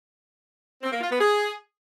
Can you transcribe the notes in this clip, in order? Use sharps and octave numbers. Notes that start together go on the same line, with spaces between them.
C4
A#3
F4
B3
G#4